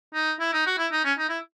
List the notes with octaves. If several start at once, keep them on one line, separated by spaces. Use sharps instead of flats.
D#4
E4
D#4
F#4
E4
D#4
C#4
D#4
E4